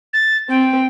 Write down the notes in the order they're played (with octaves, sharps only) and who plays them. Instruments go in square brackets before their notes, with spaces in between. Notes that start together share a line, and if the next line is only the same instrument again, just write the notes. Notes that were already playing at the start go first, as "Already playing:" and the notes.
[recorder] A6
[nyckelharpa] C4 [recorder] G5